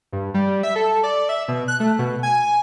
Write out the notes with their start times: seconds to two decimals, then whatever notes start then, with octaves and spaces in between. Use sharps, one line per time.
0.13 G2
0.34 G3
0.63 E5
0.76 A4
1.03 D5
1.29 E5
1.48 B2
1.68 F#6
1.80 A3
1.99 B2
2.23 G#5